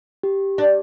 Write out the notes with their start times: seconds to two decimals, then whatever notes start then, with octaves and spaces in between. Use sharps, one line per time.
0.23 G4
0.58 D4 D5